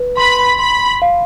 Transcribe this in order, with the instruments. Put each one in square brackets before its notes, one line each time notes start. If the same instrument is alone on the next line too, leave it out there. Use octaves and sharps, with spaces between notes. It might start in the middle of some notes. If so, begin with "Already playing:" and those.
Already playing: [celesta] B4
[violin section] B5 [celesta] C6
[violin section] B5 [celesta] C6
[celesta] F5